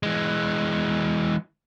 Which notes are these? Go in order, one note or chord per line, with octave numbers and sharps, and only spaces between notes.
E3 G#3